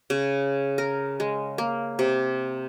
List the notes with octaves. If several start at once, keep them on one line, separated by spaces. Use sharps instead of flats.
C#3
A#4
G#3
A#3
C3